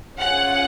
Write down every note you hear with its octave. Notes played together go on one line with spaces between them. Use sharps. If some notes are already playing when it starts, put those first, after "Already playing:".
C#4 F4 G#4 F#5